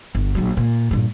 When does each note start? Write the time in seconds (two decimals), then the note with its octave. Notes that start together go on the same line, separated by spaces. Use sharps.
0.15 G1
0.35 A#1 F#3
0.57 A#2
0.91 G2 A#2